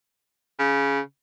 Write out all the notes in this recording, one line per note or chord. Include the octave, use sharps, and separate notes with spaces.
C#3